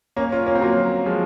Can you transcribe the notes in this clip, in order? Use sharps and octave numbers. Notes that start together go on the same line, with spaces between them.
A#3 C#4
C#4 F4
A#3 C#4
C4
F#3 A#3
F3 G#3